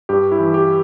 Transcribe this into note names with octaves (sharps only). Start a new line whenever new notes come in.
G2 G4
E4
E3
G4